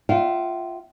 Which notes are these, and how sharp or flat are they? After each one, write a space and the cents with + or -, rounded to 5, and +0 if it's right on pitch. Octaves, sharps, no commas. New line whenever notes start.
F4 +0 E5 +0 G5 -35